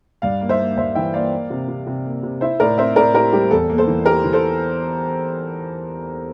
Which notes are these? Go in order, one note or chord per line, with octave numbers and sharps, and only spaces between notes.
G2 D5 F5
A#3
C5 E5
A#3
G2 C5 E5
E3 E5 G5
A#3 D5 F5
A#3
C3
C3
C3
A#3
C3
E4 C5 E5
A2 A#4 D5
C4 C5 E5
A2 A#4 D5
E4 G4 A#4
G3 G4
E2 A4
A#3
A4 C5
E3
A#3 G4 A#4
E3
A4 C5